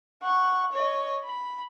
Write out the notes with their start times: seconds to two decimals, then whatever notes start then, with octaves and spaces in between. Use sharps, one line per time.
0.22 F#5 C#6
0.72 C#5 D#5
1.23 B5